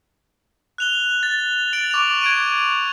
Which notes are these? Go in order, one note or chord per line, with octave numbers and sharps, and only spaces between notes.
F#6 F7 G7
A6
A6 D7 F7 F#7
C#6 D6 A6 F7
G#6 D7 D#7